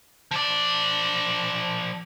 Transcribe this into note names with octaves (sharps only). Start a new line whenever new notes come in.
F3 D5